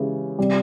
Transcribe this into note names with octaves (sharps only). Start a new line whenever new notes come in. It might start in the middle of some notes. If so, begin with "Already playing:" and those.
Already playing: C#3 E3 G#3 E4 G4
C3 G3